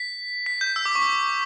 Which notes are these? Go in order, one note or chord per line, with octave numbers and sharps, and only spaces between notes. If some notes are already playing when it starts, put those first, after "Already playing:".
Already playing: B6
B6
G6
E6
D6
C#6